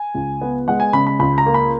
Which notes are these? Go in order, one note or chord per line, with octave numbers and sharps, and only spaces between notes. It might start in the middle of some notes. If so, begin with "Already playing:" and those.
Already playing: G#5
C#2
B3
G#3 F#5
G#5
C#3 B5
B5
C#2 B5
A#5
A#3
B5